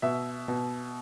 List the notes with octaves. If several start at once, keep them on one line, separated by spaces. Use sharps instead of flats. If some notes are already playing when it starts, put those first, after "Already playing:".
B2 E5
B2